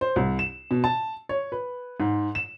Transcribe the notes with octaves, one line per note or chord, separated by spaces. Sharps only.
C5
C2
E7
B2
A5
C#5
B4
G#2
E7